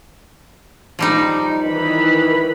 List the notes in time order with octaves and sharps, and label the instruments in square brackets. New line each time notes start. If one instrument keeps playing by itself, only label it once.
[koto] F3 G3 D#4
[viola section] D#3 E3 B5